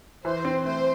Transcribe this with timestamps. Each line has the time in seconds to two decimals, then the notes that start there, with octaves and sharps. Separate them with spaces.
0.24 E3 C5
0.45 C4
0.65 A3 C5